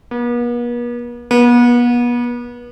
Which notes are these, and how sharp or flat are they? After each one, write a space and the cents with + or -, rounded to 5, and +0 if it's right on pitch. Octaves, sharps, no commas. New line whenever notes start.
B3 -45
B3 -35